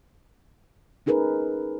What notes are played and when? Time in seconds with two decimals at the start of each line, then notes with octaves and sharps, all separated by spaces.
1.06 C#4 D#4 G#4 A#4 B4